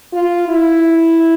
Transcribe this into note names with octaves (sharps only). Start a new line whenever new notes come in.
F4
E4